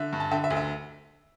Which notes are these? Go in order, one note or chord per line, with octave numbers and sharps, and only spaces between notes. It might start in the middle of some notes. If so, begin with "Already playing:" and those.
Already playing: D3 E5
G2
A5
D3 E5 G5
E5
D2
E5